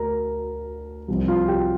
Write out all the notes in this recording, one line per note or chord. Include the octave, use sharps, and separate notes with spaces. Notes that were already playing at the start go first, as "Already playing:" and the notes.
Already playing: D2 A#4 A#5
C2 C3 F3 C4
F4 F5
G4 G5